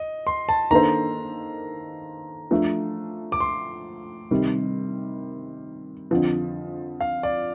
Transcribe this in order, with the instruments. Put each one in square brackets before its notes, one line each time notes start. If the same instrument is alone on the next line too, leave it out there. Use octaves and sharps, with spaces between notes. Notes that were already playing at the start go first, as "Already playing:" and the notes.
Already playing: [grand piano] D#5
C6
A5
[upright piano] D#3 A#3 D4 A4 C5 [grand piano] A#5
[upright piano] F3 A3 D4
[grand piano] D6
C6
[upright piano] C3 D#3 G3
F2 D3 F3
[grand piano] F5
D5